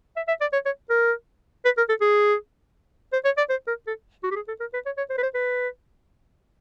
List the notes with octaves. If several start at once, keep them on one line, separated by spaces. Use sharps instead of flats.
E5
E5
D5
C#5
C#5
A#4
B4
A#4
A4
G#4
C5
C#5
D5
C5
A#4
A4
F#4
G4
G#4
A4
A#4
B4
C#5
C#5
C5
B4
C5
B4